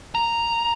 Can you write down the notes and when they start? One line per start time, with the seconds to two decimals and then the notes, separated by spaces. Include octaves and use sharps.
0.15 A#5